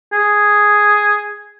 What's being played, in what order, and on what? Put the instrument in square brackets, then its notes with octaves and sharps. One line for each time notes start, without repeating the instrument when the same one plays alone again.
[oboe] G#4